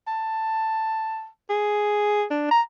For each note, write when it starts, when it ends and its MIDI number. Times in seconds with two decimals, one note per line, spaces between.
0.07 1.27 81
1.50 2.24 68
2.31 2.48 62
2.51 2.61 82